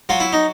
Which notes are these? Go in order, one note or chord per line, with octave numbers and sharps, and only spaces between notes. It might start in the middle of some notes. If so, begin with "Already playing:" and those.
F#3 F4
E4
D#4